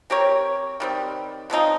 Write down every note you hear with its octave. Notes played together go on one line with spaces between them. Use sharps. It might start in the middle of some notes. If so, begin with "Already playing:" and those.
C4 G4 A#4 C#5
D#3 G3 C4
C#3 F3 C4 D#4